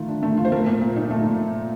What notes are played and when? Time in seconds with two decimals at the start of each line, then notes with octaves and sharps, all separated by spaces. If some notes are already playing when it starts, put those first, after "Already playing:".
Already playing: D#3 A3 F4
0.08 D4
0.23 A3
0.37 F4
0.45 C5
0.52 A3 A#4
0.66 A#2
0.81 A#2
0.96 D#4
1.11 A3
1.25 A#2